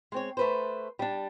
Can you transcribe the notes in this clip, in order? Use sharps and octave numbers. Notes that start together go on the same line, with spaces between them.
G#3 C4 C#5
A3 B4 C5
G3 D4